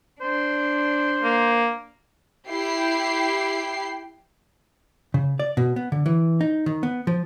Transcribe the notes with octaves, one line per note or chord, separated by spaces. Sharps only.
D4 C5
A#3
E4 G4 G5 C7
C#3
D5
B2
B3
D3
E3
D#4
D#3
B3
F3